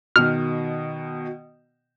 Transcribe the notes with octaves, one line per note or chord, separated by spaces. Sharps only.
B2 D#3 F6